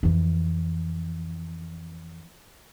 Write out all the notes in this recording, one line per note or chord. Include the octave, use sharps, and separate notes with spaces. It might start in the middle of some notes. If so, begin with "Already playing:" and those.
F2 E3